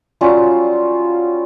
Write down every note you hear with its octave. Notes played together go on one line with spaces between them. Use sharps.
F#3 G3 C#4 F4